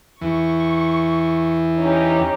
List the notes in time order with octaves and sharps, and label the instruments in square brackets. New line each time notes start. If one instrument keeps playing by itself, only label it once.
[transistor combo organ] E2 E3 [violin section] C#6
[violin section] C#4 D#4 G4